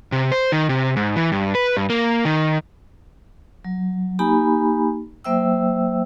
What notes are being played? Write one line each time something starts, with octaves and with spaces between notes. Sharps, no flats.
C3
C5
D#3
C3
G#2
E3
G2
B4
G2
A#3
D#3
F#3
A#3 D#4 G4 G#5 A#5 B5
F#3 A#3 C5 E5 G5 E6